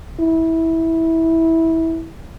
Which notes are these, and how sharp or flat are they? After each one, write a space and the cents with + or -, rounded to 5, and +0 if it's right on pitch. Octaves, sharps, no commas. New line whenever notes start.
E4 -15